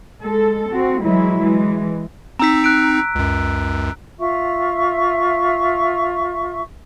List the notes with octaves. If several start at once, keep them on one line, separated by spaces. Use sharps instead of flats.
G#3 A4
C4 F#4
E3 F#3 G#3 E4
E3 G#3
C4 D#4 A#5 E6 B6
F#6 D7
C#2 F#2
F4 E5 C#6